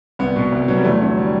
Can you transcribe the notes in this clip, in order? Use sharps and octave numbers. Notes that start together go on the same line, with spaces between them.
C2 B3
B2
C2
B2 F#3
G3
E2 A3
D3 F#3
G3